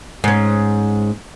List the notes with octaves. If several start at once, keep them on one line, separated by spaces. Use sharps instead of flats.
G#2 C#4